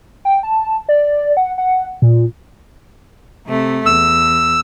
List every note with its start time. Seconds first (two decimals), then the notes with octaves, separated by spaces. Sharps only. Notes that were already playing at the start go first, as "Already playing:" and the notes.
0.25 G5
0.43 A5
0.89 D5
1.37 F#5
1.58 F#5
2.02 A#2
3.47 C3 A3
3.86 E2 E6